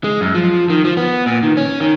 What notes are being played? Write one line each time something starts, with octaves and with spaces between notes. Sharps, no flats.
G#3
F#2
F3
D#3
F3
B3
A#2
D#3
C#4
D#3